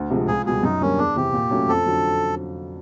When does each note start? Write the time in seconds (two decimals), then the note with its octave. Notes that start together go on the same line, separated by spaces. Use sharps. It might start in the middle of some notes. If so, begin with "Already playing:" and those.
Already playing: D2
0.11 C3 F3 G#3
0.28 C#2 G#4
0.46 B2 G3 G#4
0.63 F#2 D#4
0.81 D3 G3 A#3 C#4
0.98 E2 D4
1.16 C3 E3 G4
1.33 A#2
1.51 F#3 A3 C#4
1.69 F2 A4
1.86 D3 F#3